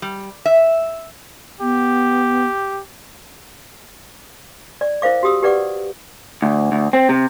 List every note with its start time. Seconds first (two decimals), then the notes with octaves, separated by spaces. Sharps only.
0.02 G3
0.46 E5
1.61 B3 G4
4.81 D5
5.02 E4 A#4 C5 F5 D6
5.23 F#4 G4 D#6 E6
5.43 G4 B4 D5 F#5 D6
6.42 D2
6.72 D2
6.93 C4
7.09 C3